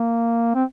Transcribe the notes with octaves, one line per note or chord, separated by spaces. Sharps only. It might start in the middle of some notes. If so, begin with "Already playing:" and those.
Already playing: A#3
C4